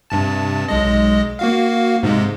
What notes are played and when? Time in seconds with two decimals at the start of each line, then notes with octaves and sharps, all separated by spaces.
0.10 G2 C3 A5
0.68 B1 G#3 D#5
1.39 A#3 F#4 F5
2.03 G#2 C3 G#3